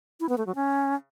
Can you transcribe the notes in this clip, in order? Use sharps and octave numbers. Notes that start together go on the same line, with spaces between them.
E4
B3
A3
F#3
C#4